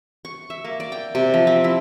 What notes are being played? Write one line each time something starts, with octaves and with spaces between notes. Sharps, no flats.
C#6
E5
A#3
D5
G5
C3
F3
C4
E4